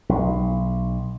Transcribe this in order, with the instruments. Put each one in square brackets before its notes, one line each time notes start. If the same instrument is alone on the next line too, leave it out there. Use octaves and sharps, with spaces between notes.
[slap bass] B1